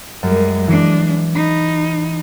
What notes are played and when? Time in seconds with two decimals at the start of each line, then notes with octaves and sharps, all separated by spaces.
0.23 F#2 G3 G#3
0.68 E3 G#3 D4
1.35 D#4 B5